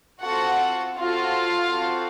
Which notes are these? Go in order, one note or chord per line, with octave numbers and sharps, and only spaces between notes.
C4 F4 F#4 A4 F#5
C4 F4 F#4 A4 F5
C4 F#4 A4